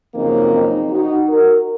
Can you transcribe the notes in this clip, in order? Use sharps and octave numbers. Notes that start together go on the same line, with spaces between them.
F#2 C#3 F3 A#3 C4 D#4
C4 D#4
D#4 F#4
F#4 A#4